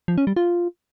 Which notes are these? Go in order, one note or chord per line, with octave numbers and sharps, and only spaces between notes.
F3
C#4
G3
F4